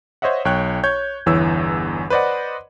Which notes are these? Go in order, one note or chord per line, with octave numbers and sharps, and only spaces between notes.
C5 C#5 D#5 E5 F#5
B1 C#5 G5 F#6
C#5 G6 G#6
G1 E2 E3 C#5 E6
B4 C5 D5 D#5 F#5